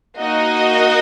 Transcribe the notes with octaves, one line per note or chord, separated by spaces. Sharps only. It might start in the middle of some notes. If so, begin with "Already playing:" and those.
A#3 D#4 F#4 D#5